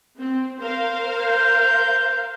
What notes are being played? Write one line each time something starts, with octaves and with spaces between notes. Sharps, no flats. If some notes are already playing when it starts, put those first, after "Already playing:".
C4
A#4 C5 F5
G6